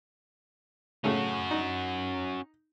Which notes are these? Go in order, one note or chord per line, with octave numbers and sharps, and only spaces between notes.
A2 C#3 A3 C#4 F#4
D#4